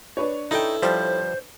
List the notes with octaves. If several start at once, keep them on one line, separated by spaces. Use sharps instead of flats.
D4 B4 C#5
D#4 E4 A4 G5
F3 G3 C5